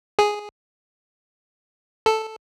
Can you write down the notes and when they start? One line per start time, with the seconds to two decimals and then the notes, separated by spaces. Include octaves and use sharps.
0.19 G#4
2.06 A4